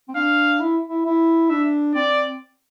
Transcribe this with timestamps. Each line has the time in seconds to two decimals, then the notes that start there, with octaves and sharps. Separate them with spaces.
0.09 C4
0.15 D4 F5
0.60 E4
0.90 E4
1.06 E4
1.49 D4 E5
1.95 C4 D5